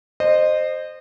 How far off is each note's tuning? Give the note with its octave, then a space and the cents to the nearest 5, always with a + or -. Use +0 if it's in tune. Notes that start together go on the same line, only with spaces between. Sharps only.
C5 +0 D#5 -25